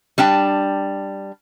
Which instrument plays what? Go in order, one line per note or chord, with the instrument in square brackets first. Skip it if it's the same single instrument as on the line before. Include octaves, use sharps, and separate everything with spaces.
[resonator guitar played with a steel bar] G3 D4 G5 A5